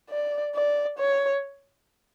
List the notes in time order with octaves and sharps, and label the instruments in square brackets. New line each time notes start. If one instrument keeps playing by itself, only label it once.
[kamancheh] D5
D5
C#5